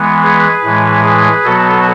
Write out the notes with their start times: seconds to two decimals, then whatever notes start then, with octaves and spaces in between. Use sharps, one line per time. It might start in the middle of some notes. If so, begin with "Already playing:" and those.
Already playing: E3 G#3 B3
0.22 G#4 B4
0.63 A2 E3 G#3
1.03 G#4 B4
1.44 B2 F#3 B3 F#4 A4